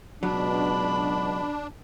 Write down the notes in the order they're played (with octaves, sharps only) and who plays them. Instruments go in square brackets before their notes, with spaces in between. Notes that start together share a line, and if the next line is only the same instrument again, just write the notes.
[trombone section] C#2 B2 [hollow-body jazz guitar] F#3 [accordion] D4 [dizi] B5